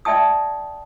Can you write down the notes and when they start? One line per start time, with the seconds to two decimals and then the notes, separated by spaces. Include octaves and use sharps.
0.05 D5 E5 G5 A5 D#6